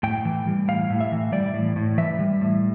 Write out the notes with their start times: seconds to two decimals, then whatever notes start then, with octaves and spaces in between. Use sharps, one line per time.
0.03 A2 G5
0.25 E3
0.47 G3
0.68 A2 F5
0.90 A2
1.00 E5
1.12 E3
1.32 G3 D5
1.54 A2
1.76 A2
1.98 E3 E5
2.19 G3
2.41 A2